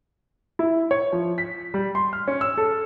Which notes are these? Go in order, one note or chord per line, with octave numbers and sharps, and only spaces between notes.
E4
C#5
F3
B6
G3
C6
F6
C#4
E6
A4